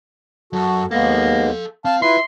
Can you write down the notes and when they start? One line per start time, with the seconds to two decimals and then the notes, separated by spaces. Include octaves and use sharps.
0.53 F#2 F#4 A4
0.91 D#2 G#3 A#3 B3 A4 F5
1.85 C4 F5 A5
2.02 E4 F4 B4 E5 C6